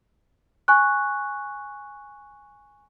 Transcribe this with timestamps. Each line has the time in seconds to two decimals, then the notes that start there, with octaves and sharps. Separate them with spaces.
0.68 G#5 C#6 F#6